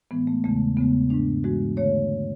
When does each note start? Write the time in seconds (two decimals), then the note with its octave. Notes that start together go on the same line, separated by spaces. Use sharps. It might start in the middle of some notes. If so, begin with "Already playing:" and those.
0.11 A2 E3 G#3 B3
0.27 A3
0.44 E2 C#3 G#3 A3
0.77 E2 C#3 G#3 B3
1.10 G#2 G#3 D4
1.44 G#2 E3 G#3 F#4
1.77 D3 A3 C#5